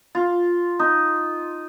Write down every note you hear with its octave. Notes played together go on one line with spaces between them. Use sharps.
F4
D#4